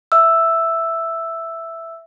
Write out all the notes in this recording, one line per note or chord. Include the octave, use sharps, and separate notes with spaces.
E5 E6